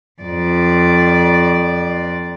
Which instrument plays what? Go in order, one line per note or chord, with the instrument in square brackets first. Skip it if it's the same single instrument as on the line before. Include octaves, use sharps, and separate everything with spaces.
[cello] F2 D5